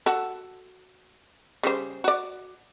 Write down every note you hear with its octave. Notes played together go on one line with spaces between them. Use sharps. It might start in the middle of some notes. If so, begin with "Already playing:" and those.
F#4 A4
C#3 G3 C5
F#4 D5